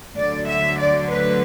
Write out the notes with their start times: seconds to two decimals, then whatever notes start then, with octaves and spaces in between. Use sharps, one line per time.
0.17 D2 D3 F#3 D5
0.47 E5
0.78 D5
1.09 B4